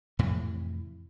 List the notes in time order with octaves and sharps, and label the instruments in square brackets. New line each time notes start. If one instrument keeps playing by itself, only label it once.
[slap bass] F2 A2 C3 E3